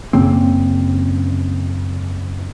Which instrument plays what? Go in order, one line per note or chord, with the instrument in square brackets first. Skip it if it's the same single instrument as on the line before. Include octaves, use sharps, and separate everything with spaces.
[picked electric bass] F#2 C#3 A#3 C4